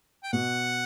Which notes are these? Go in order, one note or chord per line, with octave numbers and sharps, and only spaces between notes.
G5
B2 F#5